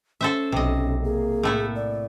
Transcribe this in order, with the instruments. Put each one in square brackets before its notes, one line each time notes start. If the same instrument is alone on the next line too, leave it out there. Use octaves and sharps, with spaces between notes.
[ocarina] C#4 [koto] A4 C5 E5
[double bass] B1 [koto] C3 D#5
[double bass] A#3 [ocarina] G#4
[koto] A2 A3 E4
[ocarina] D5